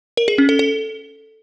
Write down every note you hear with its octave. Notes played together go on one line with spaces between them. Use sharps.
A#4
G#4
C#4
A4
A4